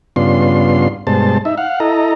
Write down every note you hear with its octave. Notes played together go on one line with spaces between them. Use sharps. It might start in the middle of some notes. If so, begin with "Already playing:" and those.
G2 C#3 B3 D4 F4 C6
G2 B2 G#3 C5 A5
D#4 E5
F5 F#5
E4 A4 D#5 A#5